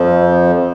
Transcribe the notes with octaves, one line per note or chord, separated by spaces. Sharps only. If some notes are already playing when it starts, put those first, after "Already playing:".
Already playing: F2 F3